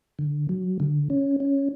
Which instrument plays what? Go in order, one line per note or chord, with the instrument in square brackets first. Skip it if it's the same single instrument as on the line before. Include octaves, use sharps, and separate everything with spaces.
[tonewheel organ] D3
F#3
D3
C#4
C#4